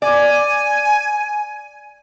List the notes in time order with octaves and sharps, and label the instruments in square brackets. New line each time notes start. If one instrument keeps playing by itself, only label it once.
[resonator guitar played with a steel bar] D5 [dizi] G#5